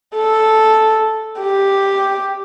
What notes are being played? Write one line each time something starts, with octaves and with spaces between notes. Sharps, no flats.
A4
G4